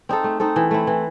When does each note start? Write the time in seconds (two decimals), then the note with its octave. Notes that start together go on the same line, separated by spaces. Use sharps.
0.09 C4 D#4 A4
0.24 A3
0.40 C4 D#4 A4
0.56 E3
0.71 A3 C4 E4
0.87 E3